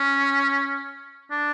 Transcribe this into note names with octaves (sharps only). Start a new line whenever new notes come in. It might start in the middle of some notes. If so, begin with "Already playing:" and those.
Already playing: C#4
D4